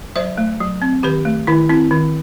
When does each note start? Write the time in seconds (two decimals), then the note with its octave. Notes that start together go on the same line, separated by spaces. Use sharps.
0.16 F#3 C5 E5
0.38 A3
0.60 F#3
0.82 C4
1.03 D#3 G4 B4
1.25 A3
1.47 D#3 E4
1.69 C4 E4
1.91 D#3